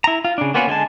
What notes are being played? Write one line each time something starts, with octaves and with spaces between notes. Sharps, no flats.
E4 A#5
F4
C#3 D4
A#3 B3 C#4 F4 F#4
D3 G#3 G#5 A5